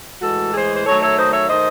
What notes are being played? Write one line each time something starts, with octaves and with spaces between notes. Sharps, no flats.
A2 E3 G#3 F#4 A4
G#4 C5
C5
D#3 F#3 A3 A4 C#5
C#5 E5
C5 D#5
C#5 E5
D#3 A3 C5 D#5